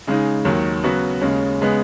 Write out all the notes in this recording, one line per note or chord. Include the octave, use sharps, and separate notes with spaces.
C#3 G#3 D#4
D#2 D#3 F#3
C#3 F#3 B3 F#4
D#2 C#3 G#3 C#4
C#3 G#3 B3